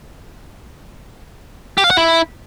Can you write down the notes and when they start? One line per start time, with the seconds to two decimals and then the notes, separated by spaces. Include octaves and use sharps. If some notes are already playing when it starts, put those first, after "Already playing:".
1.78 G4
1.84 F5
1.91 F#5
1.97 E4